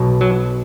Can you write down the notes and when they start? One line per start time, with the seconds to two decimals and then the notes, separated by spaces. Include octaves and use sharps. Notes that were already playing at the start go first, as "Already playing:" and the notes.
Already playing: B1 B2
0.21 F#3